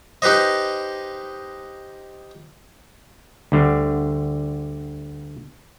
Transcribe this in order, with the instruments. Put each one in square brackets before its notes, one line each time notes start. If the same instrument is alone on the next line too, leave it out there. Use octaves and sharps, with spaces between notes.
[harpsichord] D#4 G4 B4 C5 D#5
[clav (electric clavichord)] D2 D3 G3